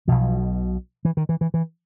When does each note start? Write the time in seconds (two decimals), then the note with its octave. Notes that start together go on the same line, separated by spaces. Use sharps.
0.08 B1 B2 F3
1.05 E3
1.17 D#3
1.29 E3
1.41 E3
1.54 E3